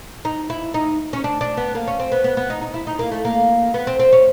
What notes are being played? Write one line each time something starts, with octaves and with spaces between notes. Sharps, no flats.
D#4
E4
D#4
C#4
D4
D4
B3
A#3
C#4
C4
B3
B3
B3
D#4
D#4
E4
D#4
A#3
A3
A#3
B3
C4
C4
C#4